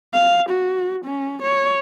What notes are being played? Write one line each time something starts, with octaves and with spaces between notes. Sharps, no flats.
F5
F#4
C#4
C#5